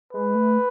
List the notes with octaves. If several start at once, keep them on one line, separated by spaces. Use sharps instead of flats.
G#3 B4
A3